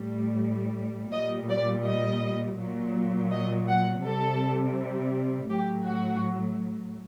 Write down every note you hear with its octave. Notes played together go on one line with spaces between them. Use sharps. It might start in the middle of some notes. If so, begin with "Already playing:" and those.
Already playing: A2 G3
A#2 G3 D#5
D5
D#5
A#2 F#3
D#5
F#5
C3 G3 A4
A2 F#3 G4
F#4